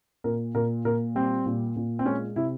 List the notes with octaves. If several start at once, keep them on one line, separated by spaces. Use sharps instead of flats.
A#2 A#4
A#2 A#4
A#2 A#4
G3 C4
A#2
A#2
C4
G#3 C#4
C3 E4